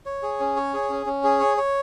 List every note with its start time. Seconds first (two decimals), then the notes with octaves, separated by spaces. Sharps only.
0.06 C#5
0.23 G#4
0.40 C#4
0.56 C#5
0.74 G#4
0.90 C#4
1.06 C#4
1.24 G#4
1.40 C#5
1.57 C#5